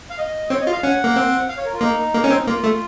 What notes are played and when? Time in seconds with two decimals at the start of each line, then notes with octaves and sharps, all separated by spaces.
0.10 F5
0.18 D#5
0.50 C4 C#5
0.61 D#5
0.67 F4
0.72 F5
0.83 C#4 F#5
1.04 A#3
1.16 C4
1.49 F5
1.57 C#5
1.65 A#4
1.73 F4
1.81 A#3 D#4
2.14 A#3
2.24 C#4
2.30 C4
2.47 A#3 F4
2.64 A3